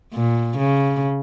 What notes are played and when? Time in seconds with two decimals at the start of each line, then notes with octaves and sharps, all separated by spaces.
0.14 A#2
0.57 C#3